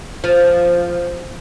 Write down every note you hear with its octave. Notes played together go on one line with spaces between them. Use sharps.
F3